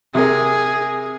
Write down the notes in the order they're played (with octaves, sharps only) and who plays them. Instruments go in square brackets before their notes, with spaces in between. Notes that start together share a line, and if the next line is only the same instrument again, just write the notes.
[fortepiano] C3 A#4 [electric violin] G#4